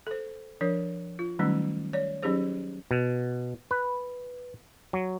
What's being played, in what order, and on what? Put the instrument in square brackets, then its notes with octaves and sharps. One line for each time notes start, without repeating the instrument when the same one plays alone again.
[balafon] A4 C5
F3 D4 A#4 C#5
F4
D#3 F#3 G3 A3 C#4 D#4
C#5 D5
F#3 C#4 D#4 G4 G#4 C5
[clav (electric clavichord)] B2
B4
F#3